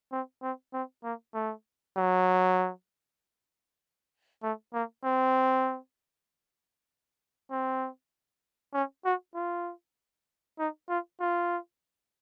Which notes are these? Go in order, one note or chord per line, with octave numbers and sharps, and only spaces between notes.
C4
C4
C4
A#3
A3
F#3
A3
A#3
C4
C4
C#4
F#4
F4
D#4
F4
F4